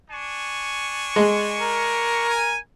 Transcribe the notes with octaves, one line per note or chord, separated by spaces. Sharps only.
D4 G#5 C#6
G#3
A#4
G#5